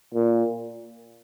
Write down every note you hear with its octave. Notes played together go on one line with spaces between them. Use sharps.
A#2